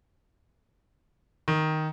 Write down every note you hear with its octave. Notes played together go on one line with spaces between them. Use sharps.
D#3